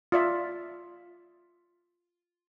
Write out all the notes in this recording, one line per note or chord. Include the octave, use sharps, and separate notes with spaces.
F4 D5 E5